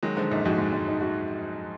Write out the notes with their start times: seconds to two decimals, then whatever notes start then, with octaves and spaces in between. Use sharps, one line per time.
0.03 D#3 F#3 G#3
0.17 D3 F3 G#3
0.31 F#2 A#2 D#4
0.45 F2 G#2 F#4
0.58 G#3
0.73 G#3
0.87 D#4
1.01 F#4